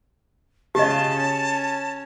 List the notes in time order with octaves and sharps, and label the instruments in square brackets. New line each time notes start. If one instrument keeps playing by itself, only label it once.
[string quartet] C#3 F4 [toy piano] G4 D#5 [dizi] A5
[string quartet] C#4